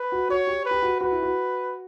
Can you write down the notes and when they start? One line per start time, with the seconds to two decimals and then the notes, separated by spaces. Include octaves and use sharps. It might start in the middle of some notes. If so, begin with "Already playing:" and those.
Already playing: B4
0.12 F#4
0.29 F#4 C#5
0.47 G4
0.65 B4
0.71 G4
0.82 F#4
1.00 F#4 B4
1.11 E4
1.22 F#4